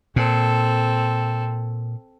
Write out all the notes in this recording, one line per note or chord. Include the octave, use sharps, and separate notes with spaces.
A#2 C4 A4